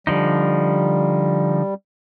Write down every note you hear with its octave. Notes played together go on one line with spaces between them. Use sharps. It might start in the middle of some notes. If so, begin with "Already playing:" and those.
D3 F3 G3 D#4